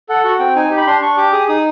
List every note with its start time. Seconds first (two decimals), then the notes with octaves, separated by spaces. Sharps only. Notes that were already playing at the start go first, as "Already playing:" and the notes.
0.09 A4 F#5
0.24 F#4 F#5
0.40 C4 G5
0.56 D#4 G#5
0.70 G4
0.77 B5
0.87 D4 C6
1.02 D4 C#6
1.17 G4 D6
1.33 G#4 D#6
1.48 D#4 D#6